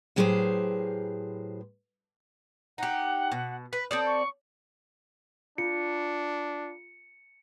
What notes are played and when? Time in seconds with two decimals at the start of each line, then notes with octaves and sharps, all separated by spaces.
0.16 A2 F#3 G4 G#4 B4 C5
2.78 D#4 G4 F#5
3.32 B2
3.73 B4 B6
3.91 C4 A4 D5 D#6
4.06 C#6
5.58 D4 F4 C#7